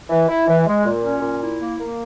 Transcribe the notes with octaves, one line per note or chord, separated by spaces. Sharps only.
E3
E4
E3
G#3
A#2
C#4
A#2
E4
A#3
A#3